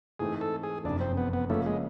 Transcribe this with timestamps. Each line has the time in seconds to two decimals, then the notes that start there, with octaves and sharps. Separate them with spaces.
0.19 G#2 E3 A3 C4 D#4 G#4
0.41 A4
0.63 G#4
0.84 F#1 F2 C3 D4
1.01 C4
1.17 B3
1.33 B3
1.50 C#3 F3 A3 A#3 C#4
1.66 G#3